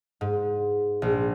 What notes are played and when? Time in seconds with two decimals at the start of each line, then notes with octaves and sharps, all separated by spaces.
0.21 G#2
1.02 A#1